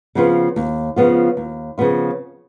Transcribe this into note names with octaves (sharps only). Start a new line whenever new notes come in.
C#3 F3 B3 F4
D#2
C#3 F3 B3 F4
D#2
C#3 F3 B3 F4